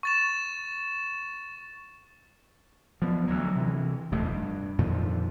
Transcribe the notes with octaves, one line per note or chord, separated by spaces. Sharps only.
C#6 A6 E7
F3 B3
D2 F#3
C3 E3
D#1 F2 C3 A3
G2
F2 A#2 D#3 F3